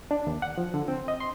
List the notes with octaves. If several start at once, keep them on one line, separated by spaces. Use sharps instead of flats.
D4
D#2
F#5
F3
D3
C4
D#5
C6